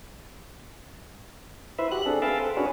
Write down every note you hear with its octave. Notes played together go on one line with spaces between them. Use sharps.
E4 B4 C5 E5
F#4 G4 F#6
C4 D4 G#4 A4
G#4 B4 E5 F5 G5 A5
A4 C5
C#4 D4 F#4 G#4 B4 C#5